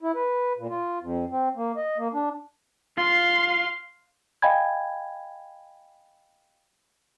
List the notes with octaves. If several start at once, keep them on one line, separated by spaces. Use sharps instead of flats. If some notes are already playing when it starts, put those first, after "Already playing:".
E4
B4
A#2
F4
F2
C4
A#3
D#5
A#3
D4
F4 F5 C6
D#5 F5 G5 G#5 B5 G#6